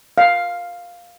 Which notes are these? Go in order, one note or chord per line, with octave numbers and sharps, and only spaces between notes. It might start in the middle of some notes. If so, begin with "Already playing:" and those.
F5